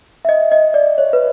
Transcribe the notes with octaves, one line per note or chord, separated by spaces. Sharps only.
E5
D#5
D#5
D5
C#5
B4